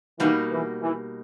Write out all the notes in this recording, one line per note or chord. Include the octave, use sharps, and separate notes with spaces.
B2 E3 G3 A#3 D#4 F#4
E3
E3